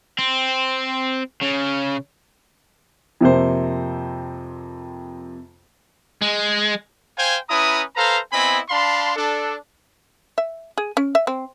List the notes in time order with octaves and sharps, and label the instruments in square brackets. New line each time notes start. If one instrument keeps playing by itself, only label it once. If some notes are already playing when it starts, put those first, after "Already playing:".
[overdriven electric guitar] C4
C#3
[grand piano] F2 C3 A#3 C5
[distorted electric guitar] G#3
[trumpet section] C5 F5 G5 G#5
C#4 E4 B4 A#5 D#6
A4 B4 C5 F5 A#5
B3 C4 E4 D#5 G#5 B5
D4 F5 A5 B5 C6
D4 A4
[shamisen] E5
G#4
C#4
E5
C4